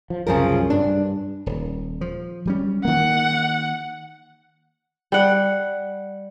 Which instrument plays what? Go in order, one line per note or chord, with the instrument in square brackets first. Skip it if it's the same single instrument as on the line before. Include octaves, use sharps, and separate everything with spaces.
[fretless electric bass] F3
[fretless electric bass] C2 F#2 [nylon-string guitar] C#3 F3 A#4
[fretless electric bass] G2 [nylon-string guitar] D4
[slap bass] D#1
F3
F#3 G3 C#4
[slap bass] D#3 A#3 [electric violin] F#5
[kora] G3 F#5